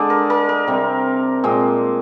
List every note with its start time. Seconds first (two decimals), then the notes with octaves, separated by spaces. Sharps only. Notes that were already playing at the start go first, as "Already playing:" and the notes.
Already playing: D3 G#3 D4 D5
0.10 A#4
0.30 A#4
0.49 A#4
0.68 C3 G3 C4
1.44 A#2 G#3 C4